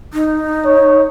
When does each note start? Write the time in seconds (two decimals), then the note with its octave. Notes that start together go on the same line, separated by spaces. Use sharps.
0.13 D#4
0.65 C#5